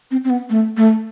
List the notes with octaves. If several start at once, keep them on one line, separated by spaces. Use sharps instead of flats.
C4
C4
B3
A3
A3